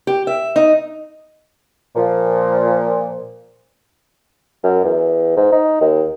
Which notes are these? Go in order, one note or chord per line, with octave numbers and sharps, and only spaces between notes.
G4
E5
D#4
A#2 F3
F#2
E2
G#2
D#4
D#2